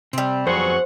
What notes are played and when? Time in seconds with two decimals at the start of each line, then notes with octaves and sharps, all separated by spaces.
0.13 C3 G3 C4
0.47 F2 F#3 B3 G#4 C5 F#5 C#6